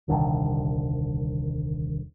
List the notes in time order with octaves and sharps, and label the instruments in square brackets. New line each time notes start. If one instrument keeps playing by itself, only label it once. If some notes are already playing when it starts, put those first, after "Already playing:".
[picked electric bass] D#1 C2 D3 D#3